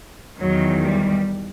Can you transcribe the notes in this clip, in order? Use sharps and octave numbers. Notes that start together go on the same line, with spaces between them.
E2 D#3 F#3
G3